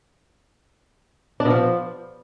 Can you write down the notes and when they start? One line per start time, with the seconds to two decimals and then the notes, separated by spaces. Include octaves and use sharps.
1.40 D4
1.45 B2
1.50 F3